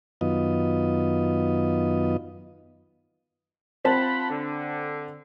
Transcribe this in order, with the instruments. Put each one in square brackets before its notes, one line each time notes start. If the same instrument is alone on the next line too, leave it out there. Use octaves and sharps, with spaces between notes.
[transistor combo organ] F#2 D#3 B3 F4 D#5
[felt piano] C4 C5 A5 [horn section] F4 F#5 B5
[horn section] D3